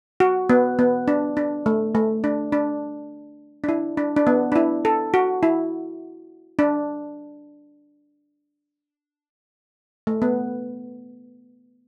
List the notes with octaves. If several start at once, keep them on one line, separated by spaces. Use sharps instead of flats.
F#4
B3
B3
D4
D4
A3
A3
D4
D4
D4
E4
D4
D4
B3
D4
E4
A4
F#4
E4
D4
A3
B3